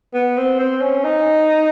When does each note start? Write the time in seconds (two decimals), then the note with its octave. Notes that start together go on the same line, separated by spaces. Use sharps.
0.14 B3
0.37 C4
0.59 C4
0.81 C#4
1.04 D#4